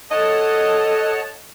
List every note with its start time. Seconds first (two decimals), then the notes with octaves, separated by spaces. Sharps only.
0.11 A4 C#5 D#5 F#5 A5